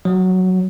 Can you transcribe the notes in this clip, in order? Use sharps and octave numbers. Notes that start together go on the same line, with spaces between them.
F#3